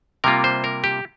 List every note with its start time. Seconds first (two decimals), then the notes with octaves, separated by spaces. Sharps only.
0.24 C3 G3 A#3 F4 A#4
0.44 C5
0.64 A#4
0.84 G4